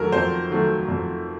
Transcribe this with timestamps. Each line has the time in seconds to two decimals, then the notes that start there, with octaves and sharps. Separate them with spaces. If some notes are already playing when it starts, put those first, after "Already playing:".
Already playing: F2 D#3 F#3 A3 A4 A#4
0.12 F2 C5
0.50 D#3 F#3 A3
0.88 F2